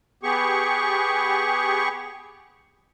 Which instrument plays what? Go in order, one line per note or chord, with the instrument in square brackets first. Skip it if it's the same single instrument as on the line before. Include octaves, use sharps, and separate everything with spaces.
[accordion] B3 G4 G#4 C#6